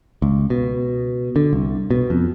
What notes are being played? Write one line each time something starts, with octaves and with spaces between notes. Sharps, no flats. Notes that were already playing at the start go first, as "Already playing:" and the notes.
C#2
B2
D3
C2
B2
F2